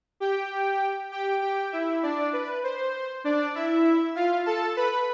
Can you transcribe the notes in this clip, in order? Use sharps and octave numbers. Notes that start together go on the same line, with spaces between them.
G4 G5
G4 G5
G4 G5
E4 E5
D4 D5
B4
C5
D4 D5
E4 E5
F4 F5
A4 A5
B4 B5